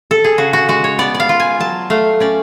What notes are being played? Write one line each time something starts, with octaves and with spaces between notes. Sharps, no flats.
A4
G#4
C#3 F#4
F#4
G#3 F#4
C#5
B3 D5
D5
F5
F4
G#5
F#3 A5
A3 F5
C#4 D5